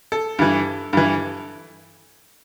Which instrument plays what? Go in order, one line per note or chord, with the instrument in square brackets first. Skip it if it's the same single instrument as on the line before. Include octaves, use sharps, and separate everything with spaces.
[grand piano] A4
G2 E3
G2 E3